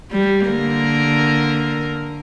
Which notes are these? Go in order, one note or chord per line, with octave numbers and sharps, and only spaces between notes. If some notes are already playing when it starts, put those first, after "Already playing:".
G3
D3 A#3 A#4